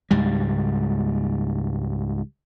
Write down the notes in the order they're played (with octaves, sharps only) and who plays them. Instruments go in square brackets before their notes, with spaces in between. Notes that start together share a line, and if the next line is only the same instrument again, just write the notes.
[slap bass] C#2 G#2 G3